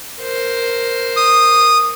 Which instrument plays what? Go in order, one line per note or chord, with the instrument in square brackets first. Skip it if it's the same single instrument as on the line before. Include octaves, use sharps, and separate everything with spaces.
[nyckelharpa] A#4 C5
[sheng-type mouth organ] D#6